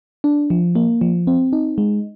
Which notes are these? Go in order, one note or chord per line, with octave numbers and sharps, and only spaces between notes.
D4
F3
A#3
F3
C4
D#4
G#3